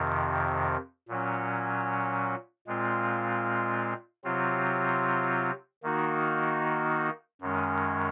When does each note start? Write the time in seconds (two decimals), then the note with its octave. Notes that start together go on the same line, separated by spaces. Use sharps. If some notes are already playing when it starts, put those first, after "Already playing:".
Already playing: F2 C3 D#3
1.08 A#2 F#3 C#4
2.67 A#2 G#3 C4 F4
4.24 C3 F#3 C4 F4
5.83 D#3 A#3 D#4 F#4
7.41 F#2 D#3 G#3 C#4